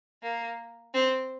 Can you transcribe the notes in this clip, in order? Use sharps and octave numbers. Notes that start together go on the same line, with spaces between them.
A#3
C4